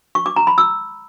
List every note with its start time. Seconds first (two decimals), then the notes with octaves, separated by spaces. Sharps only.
0.15 C#6
0.26 D6
0.36 A#5
0.47 B5
0.58 E6